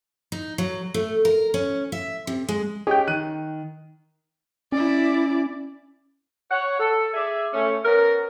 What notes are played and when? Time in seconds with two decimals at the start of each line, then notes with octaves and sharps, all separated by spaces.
0.32 D#4
0.58 F#3
0.94 A3
1.25 A#4
1.54 C#4
1.92 E5
2.27 C3
2.49 G#3
2.87 C#4 G4 G#4 D#5 G5 C#6
3.08 D#3 F#6 D#7
4.72 C#4 E4 D5
6.51 C#5 F#5
6.80 A4
7.14 G#4 D5 E5
7.53 A3 C#4
7.85 B3 C#4 A#4